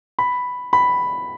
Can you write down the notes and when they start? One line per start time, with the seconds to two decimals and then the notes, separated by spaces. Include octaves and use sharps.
0.19 B5
0.73 B5